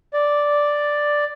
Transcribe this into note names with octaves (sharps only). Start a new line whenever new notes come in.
D5